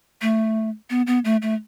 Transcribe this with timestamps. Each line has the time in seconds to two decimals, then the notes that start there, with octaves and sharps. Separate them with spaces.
0.22 A3
0.90 B3
1.07 B3
1.25 A3
1.42 A3